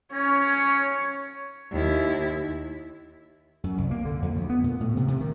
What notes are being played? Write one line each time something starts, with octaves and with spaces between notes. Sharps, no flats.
C#4 C#5
D#2 E4
F#2
C2
A#3
D3
F2
D2
B3
A#2
A2
C3
C3
D#3